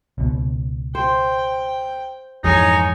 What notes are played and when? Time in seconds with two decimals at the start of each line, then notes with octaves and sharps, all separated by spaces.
0.18 C#2 B2
0.95 C5 G5
2.44 F2 G#2 E3 D#4 G#4 C#5 G#5